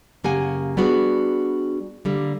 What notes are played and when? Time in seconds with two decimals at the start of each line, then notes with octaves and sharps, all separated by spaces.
0.24 F#2 C#3 A#3 G4 F#5 G#5
0.77 G3 B3 D4 F#4 G#4
2.05 D3 G3 A#3